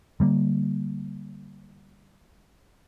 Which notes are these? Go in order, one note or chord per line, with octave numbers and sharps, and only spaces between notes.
D3 G3 A#3